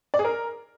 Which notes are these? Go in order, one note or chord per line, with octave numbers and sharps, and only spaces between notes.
D5
G#4
A#4